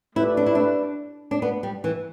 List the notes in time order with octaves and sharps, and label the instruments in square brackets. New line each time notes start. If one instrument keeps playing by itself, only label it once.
[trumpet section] A3 G4 B4 D5 [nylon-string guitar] E4
[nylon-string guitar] D4
E4
D4
D4
B3
G3
E3